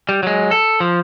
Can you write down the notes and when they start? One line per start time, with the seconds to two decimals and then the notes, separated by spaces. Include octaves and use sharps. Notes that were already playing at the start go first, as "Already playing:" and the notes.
0.09 G3
0.23 F#3 G#3
0.51 A4
0.80 F3